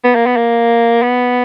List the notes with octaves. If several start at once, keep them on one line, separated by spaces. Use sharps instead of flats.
B3
A#3
B3
A#3
B3